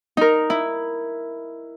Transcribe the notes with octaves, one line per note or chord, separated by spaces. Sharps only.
D#4 A#4
E4